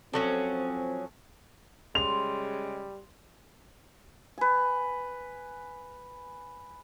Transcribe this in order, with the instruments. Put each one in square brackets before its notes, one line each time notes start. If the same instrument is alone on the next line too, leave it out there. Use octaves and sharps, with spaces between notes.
[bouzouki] F3 F#3 C#4 [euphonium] C4 [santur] A4 C#6
[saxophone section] C#3 G#3 [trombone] G3 [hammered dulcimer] C6 [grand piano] F7
[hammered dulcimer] B4 G#5